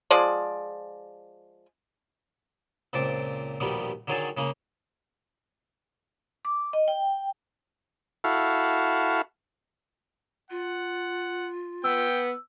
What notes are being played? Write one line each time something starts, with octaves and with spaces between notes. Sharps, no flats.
F3 G#3 G#4 D5
C#2 A#2 C4 A5 D6
A#1 D#2 B2 D#3 G3
D3 D#3 F#3 G#4 C#5 A5
C#3 G#3 A#3
D6
D#5
G5
E4 F#4 A4 F5
F4 F#5
B3 G5 E6